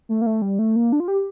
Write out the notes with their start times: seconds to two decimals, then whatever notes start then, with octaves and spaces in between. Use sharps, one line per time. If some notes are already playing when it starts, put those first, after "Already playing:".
0.09 A3
0.22 A#3
0.26 A3
0.42 G3
0.59 A3
0.76 A#3
0.92 D4
1.00 F4
1.08 G4